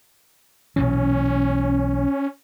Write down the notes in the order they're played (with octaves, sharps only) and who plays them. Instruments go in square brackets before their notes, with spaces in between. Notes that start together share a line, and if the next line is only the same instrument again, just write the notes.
[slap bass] B1 A#2 E3 [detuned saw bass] C#4